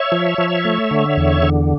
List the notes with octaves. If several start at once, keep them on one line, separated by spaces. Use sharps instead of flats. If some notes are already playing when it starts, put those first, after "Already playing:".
Already playing: C#5 E5
F3
F3
A3
D3
E2
D3